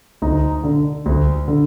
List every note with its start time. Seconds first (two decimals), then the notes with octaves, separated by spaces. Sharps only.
0.22 D2 D#4
0.64 D3
1.06 D2
1.48 D3